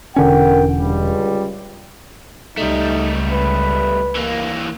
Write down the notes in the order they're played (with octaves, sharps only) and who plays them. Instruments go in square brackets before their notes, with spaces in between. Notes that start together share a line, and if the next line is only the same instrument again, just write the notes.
[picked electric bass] E1 D3 C#4 [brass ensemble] A#4 F#5 G5
[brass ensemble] C#2 G3
[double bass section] C#2 [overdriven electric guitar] G3 A3 [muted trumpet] D#4
[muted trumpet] B4
[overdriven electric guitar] E3 A#3